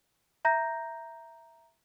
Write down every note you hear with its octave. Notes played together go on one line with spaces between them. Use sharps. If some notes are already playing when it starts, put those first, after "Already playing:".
E5 A#5 G6 A#6